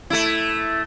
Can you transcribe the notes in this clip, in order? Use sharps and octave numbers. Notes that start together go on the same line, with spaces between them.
A3 E4